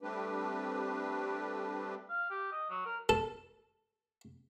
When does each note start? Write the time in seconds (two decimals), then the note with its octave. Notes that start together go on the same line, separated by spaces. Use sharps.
0.01 G3 A3 C4 D4 G4 B4
2.09 F5
2.30 G4
2.52 D#5
2.70 F#3
2.85 A#4
3.09 A4